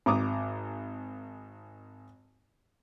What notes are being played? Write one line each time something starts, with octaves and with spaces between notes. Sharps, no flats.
G#1 A#5 D6 D#6